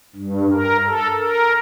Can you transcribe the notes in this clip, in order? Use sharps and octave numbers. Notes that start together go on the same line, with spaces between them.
G2
A#4
A4
A#4